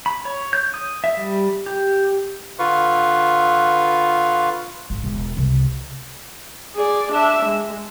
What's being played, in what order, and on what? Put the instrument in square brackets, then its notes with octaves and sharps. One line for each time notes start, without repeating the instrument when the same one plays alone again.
[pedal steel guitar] B5
C#5
G6
D#6
E5
G3
G4
[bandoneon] D3 F4 B4 F5 C#6
[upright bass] G#1
E1
C2
[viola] G#4 D5
D4 E5
G#3